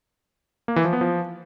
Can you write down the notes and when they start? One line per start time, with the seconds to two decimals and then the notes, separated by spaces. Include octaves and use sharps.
0.68 A#3
0.76 E3
0.85 F3
0.93 B3
1.01 F3